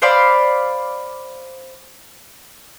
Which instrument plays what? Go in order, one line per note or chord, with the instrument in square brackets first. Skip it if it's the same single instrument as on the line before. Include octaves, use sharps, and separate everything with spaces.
[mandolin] C5 D5 F5 B5